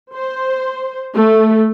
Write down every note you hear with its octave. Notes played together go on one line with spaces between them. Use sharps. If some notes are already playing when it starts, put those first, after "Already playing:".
C5
A3